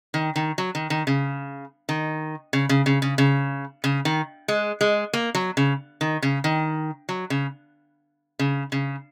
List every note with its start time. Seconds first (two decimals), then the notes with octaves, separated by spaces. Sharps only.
0.14 D#3
0.36 D#3
0.58 F#3
0.75 D#3
0.90 D#3
1.07 C#3
1.89 D#3
2.53 C#3
2.69 C#3
2.86 C#3
3.02 C#3
3.18 C#3
3.84 C#3
4.05 D#3
4.48 G#3
4.81 G#3
5.13 A#3
5.35 F#3
5.57 C#3
6.01 D#3
6.22 C#3
6.44 D#3
7.09 F#3
7.30 C#3
8.39 C#3
8.72 C#3